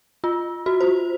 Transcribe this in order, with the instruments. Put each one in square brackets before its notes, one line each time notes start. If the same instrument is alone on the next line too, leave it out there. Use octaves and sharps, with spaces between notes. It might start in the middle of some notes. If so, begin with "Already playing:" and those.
[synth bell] F4
F#4
C5